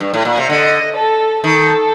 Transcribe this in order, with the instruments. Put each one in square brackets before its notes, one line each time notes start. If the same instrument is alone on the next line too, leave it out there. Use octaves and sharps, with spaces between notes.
[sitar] G2
A2
A#2
C3
[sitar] D3 [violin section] D#5
[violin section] A4
[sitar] D#3 [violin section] A4